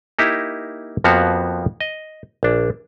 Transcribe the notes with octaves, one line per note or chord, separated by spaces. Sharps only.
A#3 D#4 E4 G4
F2 F3 A#3 B3 F#4 F5
D#5
A#1 D4